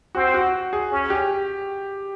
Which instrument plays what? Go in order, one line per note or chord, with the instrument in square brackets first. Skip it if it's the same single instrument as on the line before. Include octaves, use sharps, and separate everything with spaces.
[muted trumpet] C4 [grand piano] F#4
[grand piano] F#4
G#4
[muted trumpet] C#4
[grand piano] G4